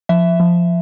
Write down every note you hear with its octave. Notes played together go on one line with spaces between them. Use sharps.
F3 E5
F3